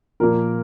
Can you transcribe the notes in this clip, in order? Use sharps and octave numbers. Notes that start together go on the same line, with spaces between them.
A#2 F3 A#3 A#4